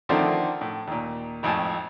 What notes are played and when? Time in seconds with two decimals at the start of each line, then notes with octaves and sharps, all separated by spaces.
0.09 D3 D#3 F3 A3 C4 D4
0.61 A2
0.87 D#2 A#2
1.43 G#1 F2 A2 G#5 A5